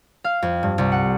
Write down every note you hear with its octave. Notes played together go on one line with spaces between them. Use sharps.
F5
F2
G2
C2
F#5